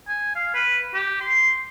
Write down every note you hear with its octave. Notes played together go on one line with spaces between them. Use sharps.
G#5
F5
B4
G4
C6